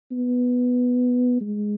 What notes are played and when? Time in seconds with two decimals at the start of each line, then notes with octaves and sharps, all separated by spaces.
0.11 B3
1.40 G#3